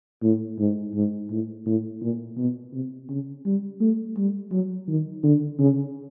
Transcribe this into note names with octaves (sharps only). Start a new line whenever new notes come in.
A2
G#2
G#2
A2
A2
A#2
B2
C3
C#3
G3
A3
G3
F#3
D#3
D3
C#3